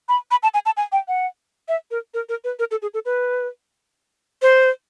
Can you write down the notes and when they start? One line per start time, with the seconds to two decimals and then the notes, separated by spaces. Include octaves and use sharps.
0.09 B5
0.31 B5
0.43 A5
0.54 G#5
0.66 A5
0.77 G#5
0.92 G5
1.08 F#5
1.68 E5
1.91 A#4
2.14 A#4
2.29 A#4
2.44 B4
2.59 A#4
2.71 A4
2.82 G#4
2.94 A4
3.05 B4
4.42 C5